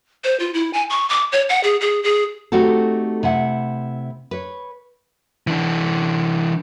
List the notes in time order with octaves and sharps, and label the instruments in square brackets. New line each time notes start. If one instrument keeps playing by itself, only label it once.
[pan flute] C5
F4
E4
G#5
C#6
D6
C#5
F#5
G#4
G#4
G#4
[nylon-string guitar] A3 C4 D#4 F#4 G4 A4
C3 E4 F#5
B4 C#5
[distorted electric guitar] E3 D4